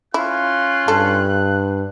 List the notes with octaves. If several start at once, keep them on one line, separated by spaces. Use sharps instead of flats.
C#4 E4 F4 C6 F#6
G2 A4